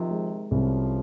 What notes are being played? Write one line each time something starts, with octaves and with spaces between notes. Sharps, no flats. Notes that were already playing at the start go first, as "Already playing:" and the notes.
Already playing: C3 D#3 F3
G#3
C2 C#3 F3